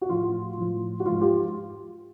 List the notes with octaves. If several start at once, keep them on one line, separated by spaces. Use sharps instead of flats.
F#4
A2 F3 F4
A2 F3
F#4
G#2 F3 F4
F4 G4